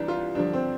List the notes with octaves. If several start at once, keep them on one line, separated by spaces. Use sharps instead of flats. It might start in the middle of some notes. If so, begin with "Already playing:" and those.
Already playing: C2 C3 E3 D4
F4
G2 D3 F3 D4
C4